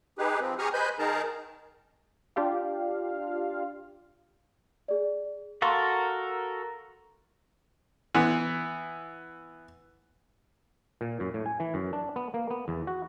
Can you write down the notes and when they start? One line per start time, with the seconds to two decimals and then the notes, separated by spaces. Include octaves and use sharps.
0.18 D#4 G4 G#4 B4
0.41 F3 C4
0.59 G4 G#4 A#5 C#6 D#6 F6
0.73 B4 C5 D#5 G#5 B5 G6
0.99 D#3 D#4 G#4 A#4 A5 A#5
2.36 D4 F4 G4 F5
4.88 G#4 D5
5.62 F#4 A4 A#4 F5 C6 C#6
8.15 E3 B3
11.01 A#2
11.20 F#2
11.34 A2
11.46 G#5
11.60 E3
11.74 F#2
11.93 D4
12.16 B3
12.34 A#3
12.50 B3
12.68 E2
12.87 F#4